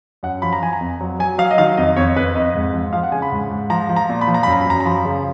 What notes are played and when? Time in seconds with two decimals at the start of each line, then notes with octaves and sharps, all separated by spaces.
0.23 F#2 F#5
0.42 F3 B5
0.53 A#5
0.62 F3 G#5
0.73 A#5
0.81 F2
1.01 F#3
1.19 F#3 G#5
1.38 F#3 F5
1.51 D#5
1.58 D#3 F5
1.77 F2 D#5
1.96 F2 C#5
2.16 F2 B4
2.35 F2 D#5
2.55 G#2
2.74 F3
2.93 F3 F5
3.03 F#5
3.12 C#3 G#5
3.22 B5
3.32 G#2
3.50 G#2
3.70 F3 A#5
3.89 F3
3.96 A#5
4.09 A#2
4.21 B5
4.27 F3
4.34 A#5
4.43 F#2 B5
4.53 A#5
4.61 B5
4.67 F#2 A#5
4.80 A#5
4.85 F3 B5
5.05 C#3